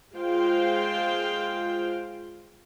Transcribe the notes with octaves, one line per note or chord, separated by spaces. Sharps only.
G#3 F4 C5 F5 G5